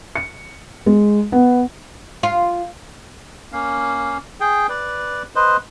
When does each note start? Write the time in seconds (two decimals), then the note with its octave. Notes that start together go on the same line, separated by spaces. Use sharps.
0.16 C#7
0.86 G#3
1.32 B3
2.23 F4
3.52 A#3 C#4 F5
4.40 G#4 G5
4.69 B4 D5
5.35 B4 C5 D#5